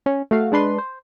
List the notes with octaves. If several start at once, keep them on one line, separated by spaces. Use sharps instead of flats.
C#4
A3 F#4 F5
G#3 D4 B4 C6
C5